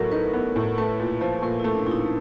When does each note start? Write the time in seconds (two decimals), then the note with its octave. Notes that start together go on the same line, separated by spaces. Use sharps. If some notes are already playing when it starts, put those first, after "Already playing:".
Already playing: A2 F#3 B3 A4 A#4
0.12 D#4 B4
0.33 B3
0.56 A2
0.78 A3 B4
1.00 A#2
1.21 F3
1.42 A#2 A#4
1.60 E4
1.64 A3 C#4
1.75 D4
1.86 A#2 E4
1.91 D#4